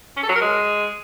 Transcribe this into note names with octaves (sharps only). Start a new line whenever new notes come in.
C#4
A4
F#3
A#4
G#3